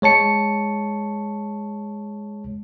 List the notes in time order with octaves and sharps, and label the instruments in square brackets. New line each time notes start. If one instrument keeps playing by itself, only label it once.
[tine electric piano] G#3 C#5 A5 C#7